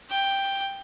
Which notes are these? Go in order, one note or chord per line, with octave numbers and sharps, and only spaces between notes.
G5